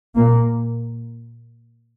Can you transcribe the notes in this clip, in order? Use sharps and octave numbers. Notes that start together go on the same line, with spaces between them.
A#2 A#3